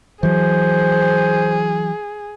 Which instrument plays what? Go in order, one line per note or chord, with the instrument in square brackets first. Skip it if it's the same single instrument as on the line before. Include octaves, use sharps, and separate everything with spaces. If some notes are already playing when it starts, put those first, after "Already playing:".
[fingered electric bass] E3 F#3 [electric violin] G#4 [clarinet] C5